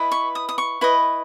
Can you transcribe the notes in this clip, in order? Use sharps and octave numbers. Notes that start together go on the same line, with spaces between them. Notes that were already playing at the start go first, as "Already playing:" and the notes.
Already playing: E4 B4 D#5
C#6
D#6
D#6
C#6
E4 B4 D#5